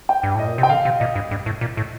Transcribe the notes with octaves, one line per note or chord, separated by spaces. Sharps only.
G5
G2
A2 D#5
A#2
C3
G5
D3 F5
C3
A#2 D#5
G2
G2
A2
A#2
A2